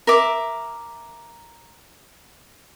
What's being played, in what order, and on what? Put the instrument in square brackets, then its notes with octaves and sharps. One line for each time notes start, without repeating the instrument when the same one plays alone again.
[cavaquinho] A#4 E5 D6